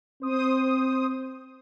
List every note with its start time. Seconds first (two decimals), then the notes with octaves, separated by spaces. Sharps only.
0.22 C4 C5 D#6